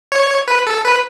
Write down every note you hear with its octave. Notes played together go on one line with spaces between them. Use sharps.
C#5
B4
A4
B4